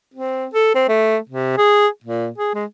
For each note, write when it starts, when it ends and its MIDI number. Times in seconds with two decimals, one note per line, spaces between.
0.14 0.47 60
0.54 0.73 69
0.75 0.84 60
0.89 1.17 57
1.29 1.55 48
1.58 1.88 68
2.04 2.28 46
2.38 2.51 68
2.55 2.65 56